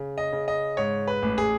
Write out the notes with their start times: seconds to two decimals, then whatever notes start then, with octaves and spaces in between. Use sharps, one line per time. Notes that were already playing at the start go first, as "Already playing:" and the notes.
Already playing: C#3
0.18 D#5
0.33 C#3
0.48 D#5
0.77 G#2 C#5
1.07 B4
1.22 A1
1.38 G#4